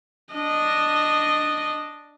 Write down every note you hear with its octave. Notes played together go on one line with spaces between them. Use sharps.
D4 D#5